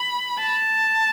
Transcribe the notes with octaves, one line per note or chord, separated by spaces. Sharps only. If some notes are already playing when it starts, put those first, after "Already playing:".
Already playing: B5
A5